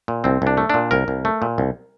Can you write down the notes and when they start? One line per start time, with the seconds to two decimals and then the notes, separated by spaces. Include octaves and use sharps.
0.08 A#2
0.24 C2 C4
0.42 C2 D4
0.57 A3
0.70 A#2 D4
0.91 C2 A#4
1.08 C2
1.25 A3
1.42 A#2
1.58 C2